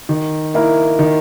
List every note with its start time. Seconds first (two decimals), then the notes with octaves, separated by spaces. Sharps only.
0.09 D#3
0.54 A#3 E4 A#4
0.99 D#3